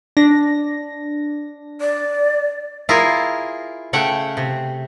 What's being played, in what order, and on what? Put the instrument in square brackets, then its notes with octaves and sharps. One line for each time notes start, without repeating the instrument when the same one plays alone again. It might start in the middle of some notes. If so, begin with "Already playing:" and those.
[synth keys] D4 A#6
[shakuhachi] D5
[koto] E4 F4 G#4 A#4
C#3 A3 F#5 G5
C3